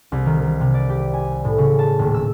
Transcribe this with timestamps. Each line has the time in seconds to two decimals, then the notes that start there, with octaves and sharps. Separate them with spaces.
0.12 C2
0.26 D#3
0.43 D#3
0.60 C3
0.74 D5
0.89 G4
1.14 G#5
1.45 A2
1.58 C#3
1.79 A5
1.99 D#1
2.14 E6